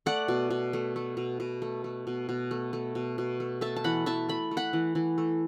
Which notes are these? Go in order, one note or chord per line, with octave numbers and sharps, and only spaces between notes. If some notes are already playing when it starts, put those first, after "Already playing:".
A3 D5 F#5
B2
B2
A3
A3
B2
B2
A3
A3
B2
B2
A3
A3
B2
B2
A3
A3 E5 A5
A5
E3 F#5 B5
E3 E5 A5
A3 B5
A3
F#5 B5
E3
E3
A3